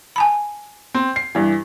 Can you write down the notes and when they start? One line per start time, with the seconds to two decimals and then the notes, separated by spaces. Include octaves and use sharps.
0.16 G#5 A5 B5
0.95 C4
1.16 C7
1.35 G2 E3